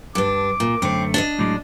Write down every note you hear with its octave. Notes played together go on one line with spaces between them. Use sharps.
G2 D4 D6
A#2
F#2 D3 A3 C4
D4 D5 D#5
A2 F#3 G#3 D6